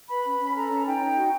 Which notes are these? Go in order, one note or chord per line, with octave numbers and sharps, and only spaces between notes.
B4 B5
C#4
C#4
A4 A#5
C#4
D#4 G5
D#4
F#4